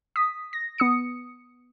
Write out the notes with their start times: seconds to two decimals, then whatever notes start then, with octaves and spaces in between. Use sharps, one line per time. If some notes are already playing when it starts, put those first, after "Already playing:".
0.16 D#6 B6
0.53 A#6
0.78 B3 D#6 C#7